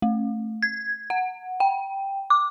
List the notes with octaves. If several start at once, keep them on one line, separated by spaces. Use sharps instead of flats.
A3
G#6
F#5
G5
D6